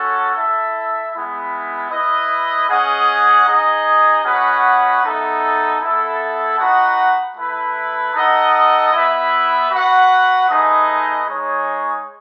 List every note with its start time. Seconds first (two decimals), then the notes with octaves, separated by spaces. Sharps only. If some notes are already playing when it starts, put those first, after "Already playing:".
Already playing: C#4 F#4 A4
0.34 E4 A4 E5
1.13 G#3 B3 E4
1.90 E4 B4 D#5
2.69 C#4 G#4 D#5 F#5
3.46 D#4 G#4 D#5
4.25 C#4 F#4 B4 D#5 F#5
5.02 B3 D#4 A4 E5
5.80 B3 E4 A4 E5
6.58 D#4 F#4 B4 D#5 F#5
7.36 A3 E4 B4
8.15 D#4 A4 D#5 F#5
8.93 B3 E4 B4 E5
9.70 F#4 B4 F#5
10.48 A3 D#4 G#4 B4 D#5
11.27 G#3 D#4 G#4 C#5